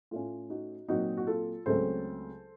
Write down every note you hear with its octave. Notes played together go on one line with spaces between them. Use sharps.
A2 A3 C#4 F4
D#4 F#4
A#2 F#3 C4 D#4 F#4
F#4
F4 A4
C#2 C#3 F#3 A3 C4 A4 C5